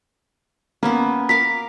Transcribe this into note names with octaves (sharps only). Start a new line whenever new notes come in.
A#3 B3 C#4 B4
A#4 F5 D6 B6